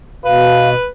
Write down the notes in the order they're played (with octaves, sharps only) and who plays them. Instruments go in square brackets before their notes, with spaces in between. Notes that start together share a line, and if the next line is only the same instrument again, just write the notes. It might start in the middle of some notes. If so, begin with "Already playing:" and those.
[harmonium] B2 [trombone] B4 [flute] F5